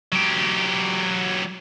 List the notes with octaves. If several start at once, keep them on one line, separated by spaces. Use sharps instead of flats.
F#3 G4